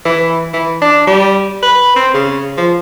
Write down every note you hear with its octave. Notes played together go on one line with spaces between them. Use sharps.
E3
E3
D4
G3
B4
C4
C#3
F3